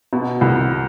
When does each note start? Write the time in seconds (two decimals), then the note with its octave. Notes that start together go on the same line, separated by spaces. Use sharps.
0.13 B2
0.41 C2